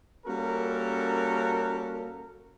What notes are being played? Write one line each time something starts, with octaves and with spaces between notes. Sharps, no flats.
G3 A#3 C#4 F#4 A4 A#4